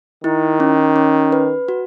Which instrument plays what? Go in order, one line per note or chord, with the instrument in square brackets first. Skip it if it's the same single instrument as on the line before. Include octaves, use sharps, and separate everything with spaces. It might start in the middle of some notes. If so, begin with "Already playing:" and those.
[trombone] D#3 [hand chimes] E4
[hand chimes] C#4
C#4
B4
F#4